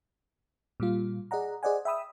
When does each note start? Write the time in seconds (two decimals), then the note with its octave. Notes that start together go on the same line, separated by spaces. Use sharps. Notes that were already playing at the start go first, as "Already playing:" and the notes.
0.80 A#2 G3 F4
1.31 G#4 D5 D#5 F#5 A#5
1.63 G#4 C5 D5 D#5 F#5 G#5
1.85 E5 G5 B5 D#6 E6